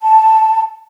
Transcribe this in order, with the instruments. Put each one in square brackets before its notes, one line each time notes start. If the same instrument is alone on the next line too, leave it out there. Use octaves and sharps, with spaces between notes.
[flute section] A5